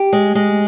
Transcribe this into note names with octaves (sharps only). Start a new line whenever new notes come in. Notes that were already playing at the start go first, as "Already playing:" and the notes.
Already playing: G4
G#3
G#3